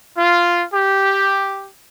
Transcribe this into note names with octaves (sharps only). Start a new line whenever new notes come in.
F4
G4